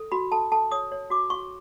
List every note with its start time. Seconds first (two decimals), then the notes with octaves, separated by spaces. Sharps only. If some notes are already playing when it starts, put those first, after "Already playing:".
Already playing: A4
0.12 F#4 B5
0.32 A4 A5
0.52 A4 A5
0.72 C#5 D#6
0.92 C#5
1.10 F#4 D6
1.30 F#4 C#6